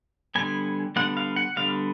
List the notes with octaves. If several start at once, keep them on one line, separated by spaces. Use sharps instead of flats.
D3 G3 B3 G#5
D3 G3 B3 F#5
F5
F#5
D3 G3 B3 F5